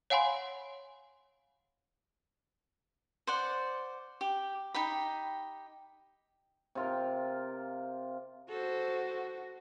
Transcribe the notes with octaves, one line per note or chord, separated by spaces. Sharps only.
C#5 F5 F#5 G#5 B5 C6
C5 D5 F#5
G4
D#4 G4 G5 B5
C3 F4 A#4
F#4 A4 C5